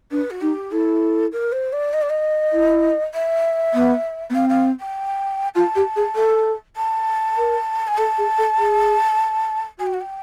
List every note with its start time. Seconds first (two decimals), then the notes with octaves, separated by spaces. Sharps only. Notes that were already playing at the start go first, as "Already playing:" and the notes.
0.11 D4 B4
0.30 F#4
0.41 D#4 G4
0.71 E4 A4
1.32 A#4
1.52 C5
1.72 D5
1.93 D#5
2.02 D5
2.09 D#5
2.52 E4
3.14 E5
3.74 B3
4.30 B3
4.34 C4 F5
4.49 F5
4.80 G5
5.55 F4 A5
5.75 G4
5.96 G#4
6.16 A4
6.76 A5
7.37 A#4
7.87 G#5
7.97 A4 A5
8.18 G#4
8.38 A4
8.59 G#4
9.79 F#4 G#5
9.86 G5
9.93 F#5
10.01 G5